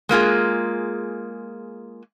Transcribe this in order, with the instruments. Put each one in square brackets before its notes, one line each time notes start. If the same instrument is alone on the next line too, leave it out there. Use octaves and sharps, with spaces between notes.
[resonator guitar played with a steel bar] G#3 A#3 F4 G#4